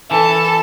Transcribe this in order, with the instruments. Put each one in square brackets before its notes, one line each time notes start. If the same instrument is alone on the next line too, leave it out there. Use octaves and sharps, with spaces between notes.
[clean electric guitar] E3 [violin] A4